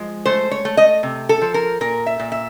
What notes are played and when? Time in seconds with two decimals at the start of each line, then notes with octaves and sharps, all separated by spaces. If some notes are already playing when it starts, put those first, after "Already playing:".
Already playing: F3 G#3
0.26 A3 C5
0.51 C#5
0.65 A3
0.77 D#5
1.03 C3
1.29 A4
1.42 F3
1.54 A#4
1.81 A#2 A#4
2.06 E5
2.19 A#2
2.32 E5